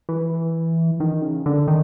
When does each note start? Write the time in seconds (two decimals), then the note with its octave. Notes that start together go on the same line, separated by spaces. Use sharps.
0.09 E3
1.00 D#3
1.22 C#3
1.46 D3
1.68 D#3